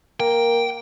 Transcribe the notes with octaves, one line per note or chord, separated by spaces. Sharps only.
A#3 G5